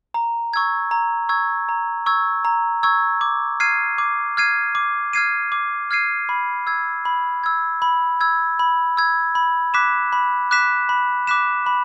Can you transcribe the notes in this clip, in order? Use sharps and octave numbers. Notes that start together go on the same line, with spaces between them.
A#5
C#6 E6 G#6
A#5
C#6 E6 G#6
A#5
C#6 E6 G#6
A#5
C#6 E6 G#6
D6
F6 G#6 C7 D#7
D6
F6 G#6 C7 D#7
D6
F6 G#6 C7 D#7
D6
F6 G#6 C7 D#7
B5
E6 G#6
B5
E6 G#6
B5
E6 G#6
B5
E6 G#6
B5
D6 F#6 B6 E7
B5
D6 F#6 B6 E7
B5
D6 F#6 B6 E7
B5